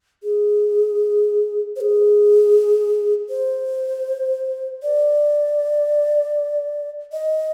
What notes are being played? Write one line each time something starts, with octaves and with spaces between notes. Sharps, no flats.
G#4
C5
G#4
C5
D5
D#5